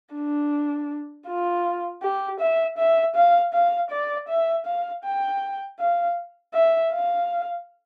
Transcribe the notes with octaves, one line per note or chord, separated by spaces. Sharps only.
D4
F4
G4
E5
E5
F5
F5
D5
E5
F5
G5
F5
E5
F5